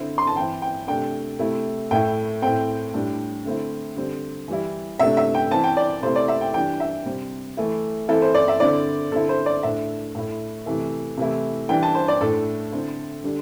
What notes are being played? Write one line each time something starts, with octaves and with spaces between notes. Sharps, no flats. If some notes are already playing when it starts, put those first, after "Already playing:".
Already playing: D3 C4 E4
C6
A5
E3 C4 E4 G5
G5
C3 A3 D4 G5
C3 A3 E4
A2 A3 E4 G5
A2 A3 C4 G5
A2 G3 D4
D3 A3 C4 E4
D3 G3 C4
E3 G3 E4
C3 A3 D4 E5
E5
G5
E3 C4 E4 A5
G5
D5
C3 A3 C4 E4 C5
D5
E5
G5
E3 G3 D4 G5
E5
C3 G3 C4
E3 A3 E4
E3 C4 E4 A4
C5
D5
E5
D3 C4 E4 D5
D3 C4 E4 A4
C5
D5
A2 A3 D4 E5
A2 A3 E4
C3 E3 A3
C3 E3 A3 E4
E3 G3 D4 G5
A5
C5
D5
A2 A3 D4 A4
D3 C4 E4
D3 G3 D4